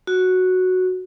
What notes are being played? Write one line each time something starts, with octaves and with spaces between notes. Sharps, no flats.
F#4